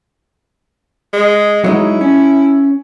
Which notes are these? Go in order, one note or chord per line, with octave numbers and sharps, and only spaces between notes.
G#3
F#3 G#3 D#4 E4
C#4